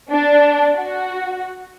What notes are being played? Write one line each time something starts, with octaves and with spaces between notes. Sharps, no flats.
D4
F#4